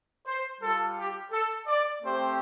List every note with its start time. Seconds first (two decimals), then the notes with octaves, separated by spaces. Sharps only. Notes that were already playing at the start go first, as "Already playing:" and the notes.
0.26 C5
0.62 G3 F4 A4
0.97 G4
1.32 A4
1.67 D5
2.03 A3 C4 G4 C5